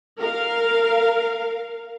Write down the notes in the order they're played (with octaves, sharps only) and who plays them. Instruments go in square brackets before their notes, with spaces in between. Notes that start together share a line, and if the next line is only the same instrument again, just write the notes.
[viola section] A#4 F5